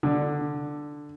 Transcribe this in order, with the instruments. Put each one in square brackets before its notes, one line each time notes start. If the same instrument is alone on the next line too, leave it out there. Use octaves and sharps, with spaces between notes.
[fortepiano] D3